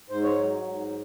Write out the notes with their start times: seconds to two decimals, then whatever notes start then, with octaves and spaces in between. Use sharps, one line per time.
0.09 G#2 C5
0.23 C#5
0.38 F#3
0.66 G#2